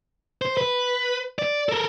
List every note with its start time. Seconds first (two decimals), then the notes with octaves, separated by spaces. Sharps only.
0.42 C5
0.57 B4
1.39 D5
1.69 A4 A#4